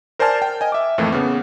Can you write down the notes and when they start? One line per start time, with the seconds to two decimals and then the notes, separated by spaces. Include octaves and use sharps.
0.19 A#4 C5 D5 G#5 A5 F6
0.42 G5
0.61 D#5 G#5
0.72 E5 D6
0.98 F2 A2 E3 A3 A#3
1.12 C#3 B3